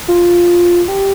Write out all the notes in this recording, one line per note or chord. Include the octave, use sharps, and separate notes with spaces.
F4
G4